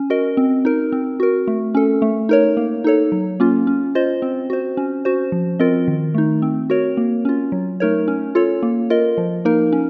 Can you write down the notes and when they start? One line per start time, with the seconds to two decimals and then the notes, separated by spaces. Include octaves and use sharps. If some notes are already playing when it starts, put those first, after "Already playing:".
Already playing: C#4
0.10 F#4 A#4 D#5
0.37 C4
0.65 D#4 A#4
0.92 C4
1.20 F#4 A#4
1.47 A3
1.75 C#4 A4
2.02 A3
2.29 D#4 A#4 C#5
2.57 A#3
2.84 D#4 A4 C#5
3.12 F#3
3.40 A#3 C#4 F4
3.67 C#4
3.95 F4 C5 D#5
4.22 C4
4.50 F#4 C5
4.77 C#4
5.05 F#4 C5
5.32 F3
5.60 C4 F4 A#4 D#5
5.88 D#3
6.14 A3 D#4
6.42 C4
6.70 F#4 A#4 C#5
6.97 A#3
7.25 C#4 F4
7.52 F#3
7.80 A3 D#4 A#4 C#5
8.08 C#4
8.35 F4 A4 C#5
8.63 A#3
8.90 F4 A#4 D#5
9.18 F3
9.45 A#3 D#4 A#4
9.73 C#4